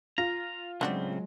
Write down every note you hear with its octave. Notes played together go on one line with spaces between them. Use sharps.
F4 A#5
A2 C#3 F#3 G#3 C4 D4 F#4 D5